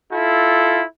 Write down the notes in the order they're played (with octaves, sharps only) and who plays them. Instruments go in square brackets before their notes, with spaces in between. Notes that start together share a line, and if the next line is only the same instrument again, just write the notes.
[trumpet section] E4 F4 A4